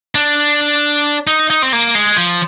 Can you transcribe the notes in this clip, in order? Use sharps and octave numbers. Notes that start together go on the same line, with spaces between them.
D4
D#4
D#4
C4
A#3
G#3
F3